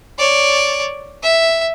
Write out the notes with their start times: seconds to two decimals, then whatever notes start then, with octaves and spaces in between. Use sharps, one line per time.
0.19 C#5 D5
1.23 E5